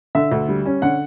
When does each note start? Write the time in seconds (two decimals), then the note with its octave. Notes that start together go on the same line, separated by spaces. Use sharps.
0.15 D3 E5
0.32 D2
0.49 G3
0.66 C#4
0.82 D3 F#5